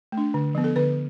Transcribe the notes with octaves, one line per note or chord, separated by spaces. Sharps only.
A3
D4
D3
F3 B3
A4
D3 B4